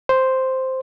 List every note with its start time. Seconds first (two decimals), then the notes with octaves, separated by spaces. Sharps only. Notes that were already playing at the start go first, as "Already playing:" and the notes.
0.09 C5